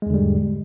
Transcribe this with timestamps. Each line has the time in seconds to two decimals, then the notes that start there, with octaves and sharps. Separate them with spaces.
0.02 G#3
0.06 E2
0.10 D3
0.14 G3
0.18 G#2